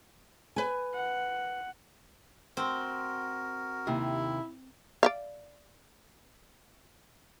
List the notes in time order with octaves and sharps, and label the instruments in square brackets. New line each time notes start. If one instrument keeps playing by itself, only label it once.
[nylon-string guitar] B4 G#5
[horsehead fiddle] F#5
[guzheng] C4 [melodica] F#4 A#4
[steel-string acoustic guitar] D#2 C3 [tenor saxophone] E4
[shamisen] D5 E5 F5